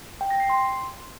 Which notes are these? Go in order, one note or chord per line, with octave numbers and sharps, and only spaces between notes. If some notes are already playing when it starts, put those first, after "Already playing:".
G5
A#6
C7
C6